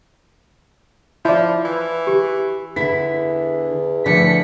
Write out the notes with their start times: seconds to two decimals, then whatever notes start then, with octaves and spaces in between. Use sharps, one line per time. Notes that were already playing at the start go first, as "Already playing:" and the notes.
1.25 F3 E4 D5
1.65 E3
2.07 G4
2.76 E2 D3 E4 B6
4.06 D3 E3 F3 A3 D4 B6 C#7